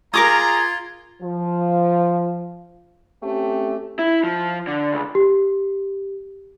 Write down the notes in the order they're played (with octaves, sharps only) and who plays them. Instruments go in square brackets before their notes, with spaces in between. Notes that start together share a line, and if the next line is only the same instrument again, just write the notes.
[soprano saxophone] F4 [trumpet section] G#4 F5 A#5 [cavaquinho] A#4 D6 D#6 [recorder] G#6
[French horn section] F3
A3 C4 C#4 G4
[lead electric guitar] E4
F3
D3
C#2
[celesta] G4